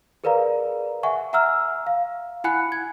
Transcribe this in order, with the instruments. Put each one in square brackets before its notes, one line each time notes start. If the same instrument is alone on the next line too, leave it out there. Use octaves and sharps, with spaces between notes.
[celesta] G#4 A#4 B4 D5 F5 A#5
E5 F#5 G#5 C#6
E5 F#5 A#5 E6 F6
F5
E4 F#5 G#5 B5 F#6 C#7
G#6